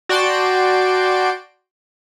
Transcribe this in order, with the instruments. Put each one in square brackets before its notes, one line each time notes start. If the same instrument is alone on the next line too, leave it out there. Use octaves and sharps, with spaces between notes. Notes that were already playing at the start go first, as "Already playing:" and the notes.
[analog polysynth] F#4 D5 G5 A5 C6 D7